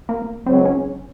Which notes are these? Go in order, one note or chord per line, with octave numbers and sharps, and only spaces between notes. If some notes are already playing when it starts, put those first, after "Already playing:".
A#3
C#2 C#3 F#3 C4
C#4